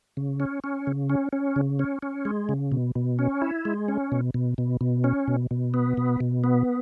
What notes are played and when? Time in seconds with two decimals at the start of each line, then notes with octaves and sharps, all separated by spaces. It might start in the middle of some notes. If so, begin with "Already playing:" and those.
0.17 C#3
0.40 C#4
0.64 C#4
0.87 C#3
1.10 C#4
1.33 C#4
1.56 C#3
1.79 C#4
2.03 C#4
2.25 G#3
2.49 C#3
2.72 B2
2.96 B2
3.19 C#4
3.42 E4
3.65 G#3
3.88 C#4
4.12 B2
4.34 B2
4.58 B2
4.81 B2
5.04 C#4
5.28 B2
5.51 B2
5.74 B3
5.97 B2
6.20 B2
6.44 B3